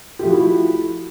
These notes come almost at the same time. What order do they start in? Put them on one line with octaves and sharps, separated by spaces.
G4 A3 F3 F#4 E4